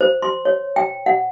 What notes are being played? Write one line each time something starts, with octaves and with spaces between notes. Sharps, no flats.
C5
C6
C#5
G5
F#5